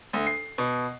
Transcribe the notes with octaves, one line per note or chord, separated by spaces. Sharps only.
D2
C7
B2